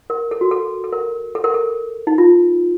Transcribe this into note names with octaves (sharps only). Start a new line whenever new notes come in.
A#4
A4
F#4
A4
A4
A#4
A4
A#4
A4
D#4
F4